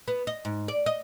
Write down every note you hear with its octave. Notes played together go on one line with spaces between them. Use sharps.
B3
D#5
G#2
D5
D#5